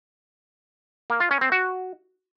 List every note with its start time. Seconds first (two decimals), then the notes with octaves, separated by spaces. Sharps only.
1.10 A#3
1.20 F4
1.31 C#4
1.41 C4
1.52 F#4